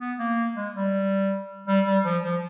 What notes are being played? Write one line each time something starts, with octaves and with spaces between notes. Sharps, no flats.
B3
A#3
G#3
G3
G3
G3
F3
F3